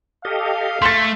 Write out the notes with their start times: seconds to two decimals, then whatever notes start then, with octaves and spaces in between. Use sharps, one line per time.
0.25 G4 A4 D#5 F5
0.82 A3 C6 C#6 G#6 A6